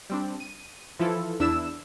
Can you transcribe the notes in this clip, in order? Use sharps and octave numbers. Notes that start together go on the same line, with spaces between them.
G3 C4 D4
D#7
E3 F3 E4 F4 A4
E2 D4 E4 E6 E7